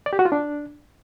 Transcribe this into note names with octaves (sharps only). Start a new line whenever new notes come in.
D5
G4
F#4
F4
D4